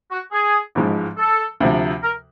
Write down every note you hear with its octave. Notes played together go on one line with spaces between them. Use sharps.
F#4
G#4
A1 G#2 F3 G#3
A4
D2 C3 F3
A#4